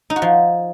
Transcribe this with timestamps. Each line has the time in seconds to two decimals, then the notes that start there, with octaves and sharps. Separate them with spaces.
0.10 D#4
0.16 F#4
0.22 F3